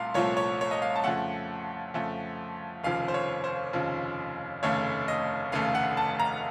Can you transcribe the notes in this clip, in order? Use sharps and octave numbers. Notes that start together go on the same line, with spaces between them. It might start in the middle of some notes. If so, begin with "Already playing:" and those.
Already playing: C2 A#2 A3 F5 C6
C2 A#2 F3 A3 C#5
C#5
C#5
D#5
F5
A5
F2 C#3 A3 F#5
F2 C#3 A3
F1 D#2 C#3 F3 F5
C5
C#5
C5
F1 D#2 C#3 F3
F1 D#2 C#3 A3 C#5
D#5
F1 D#2 C#3 A3 F5
F#5
A5
A#5